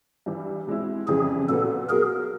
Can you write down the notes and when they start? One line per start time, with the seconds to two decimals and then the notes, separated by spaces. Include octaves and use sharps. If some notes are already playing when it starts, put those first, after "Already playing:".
0.26 G2 E3 G3
0.67 B2 G#3 C4 E4
1.08 F2 C#3 E3 G3 G#4
1.49 A#2 F#3 B3 A4
1.90 B2 F#3 A#3 G#4 A#4